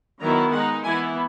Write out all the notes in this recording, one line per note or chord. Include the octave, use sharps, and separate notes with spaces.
D#3 F#3 B3 E4 A#5
G#3 D#4 F#5
E3 B3 E4 G#5